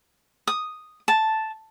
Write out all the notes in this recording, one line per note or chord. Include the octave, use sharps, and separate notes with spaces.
D#6
A5